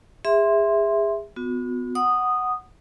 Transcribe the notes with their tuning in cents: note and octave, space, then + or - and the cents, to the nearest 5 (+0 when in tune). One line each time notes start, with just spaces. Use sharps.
G#4 -30 E5 +0 C6 +0
B3 +25 F#4 -40
F#5 +0 B5 +0 D#6 -10